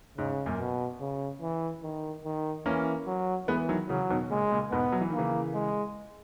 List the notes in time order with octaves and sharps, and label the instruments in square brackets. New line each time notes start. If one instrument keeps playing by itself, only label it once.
[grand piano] G#2 [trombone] C#3
[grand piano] F#2 A#2
[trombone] B2
C#3
E3
D#3
D#3
[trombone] E3 [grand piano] A#3 C#4
[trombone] F#3
[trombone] E3 [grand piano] G#3 B3
[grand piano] D#3 F#3
[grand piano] C#3 E3 [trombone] F#3
[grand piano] B2 D#3
[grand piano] A#2 C#3 [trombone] G#3
[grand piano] A#2 C#3
[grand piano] G#2 B2 [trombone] B3
[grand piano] F#3
E3
[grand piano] D#3 [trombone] A#3
[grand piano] C#3 E3
[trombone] G#3